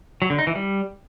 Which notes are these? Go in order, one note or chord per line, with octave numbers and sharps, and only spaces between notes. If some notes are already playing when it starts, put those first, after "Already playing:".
F#3
D3
D#4
E3
G3